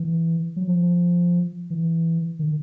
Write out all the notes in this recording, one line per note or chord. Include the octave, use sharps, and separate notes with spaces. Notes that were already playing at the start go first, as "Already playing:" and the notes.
Already playing: E3
F#3
F3
E3
D#3